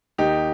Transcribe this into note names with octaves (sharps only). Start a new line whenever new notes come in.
D#2 D#4 G4